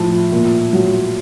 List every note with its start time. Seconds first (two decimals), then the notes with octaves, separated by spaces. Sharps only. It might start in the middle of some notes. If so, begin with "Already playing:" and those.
Already playing: A2 F3 A5
0.32 A#2
0.73 F#3